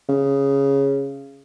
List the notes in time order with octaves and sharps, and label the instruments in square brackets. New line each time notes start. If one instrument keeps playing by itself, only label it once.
[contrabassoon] C#3